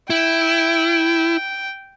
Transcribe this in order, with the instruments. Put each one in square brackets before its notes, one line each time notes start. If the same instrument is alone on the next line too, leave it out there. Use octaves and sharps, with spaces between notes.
[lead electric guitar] E4 [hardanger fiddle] G5